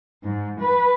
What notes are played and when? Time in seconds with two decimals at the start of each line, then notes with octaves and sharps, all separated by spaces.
0.23 G#2
0.60 B4